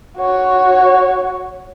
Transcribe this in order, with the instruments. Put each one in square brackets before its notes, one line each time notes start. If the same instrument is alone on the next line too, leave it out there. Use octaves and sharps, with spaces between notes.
[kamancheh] F#4 C#5